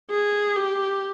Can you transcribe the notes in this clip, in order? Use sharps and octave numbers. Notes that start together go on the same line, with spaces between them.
G#4
G4